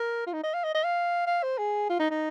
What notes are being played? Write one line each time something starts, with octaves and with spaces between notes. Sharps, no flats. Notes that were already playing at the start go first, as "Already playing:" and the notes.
Already playing: A#4
F4
D#4
D#5
F5
D#5
D#5
F5
F5
C5
G#4
F4
D#4
D#4